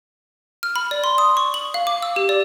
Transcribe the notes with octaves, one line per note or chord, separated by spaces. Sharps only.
F6
B5
D5
C6
D#6
C#6
F#7
F5
D6
E6
G4
D5